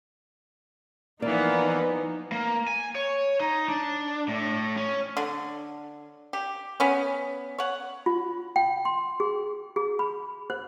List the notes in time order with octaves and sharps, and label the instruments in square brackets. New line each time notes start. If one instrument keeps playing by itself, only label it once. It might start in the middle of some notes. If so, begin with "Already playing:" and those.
[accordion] E3 [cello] F3 D#4 [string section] A#3 B3 [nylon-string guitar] D5
[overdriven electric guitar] A#3
G#5
C#5
D#4
D4
A2
C#4
[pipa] D3
G4
B3 C#4
C#5 F#5
[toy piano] F4
G5
C6
G#4
G#4
B5
C5